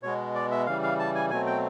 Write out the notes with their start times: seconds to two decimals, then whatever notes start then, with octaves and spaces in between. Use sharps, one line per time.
0.03 B2 G#3 B3 C#5
0.35 D5
0.51 E5
0.66 C#3 E3 G3 F5
0.83 F5
0.99 A5
1.15 G#5
1.30 B2 F#3 A3 C4 G#5
1.47 G5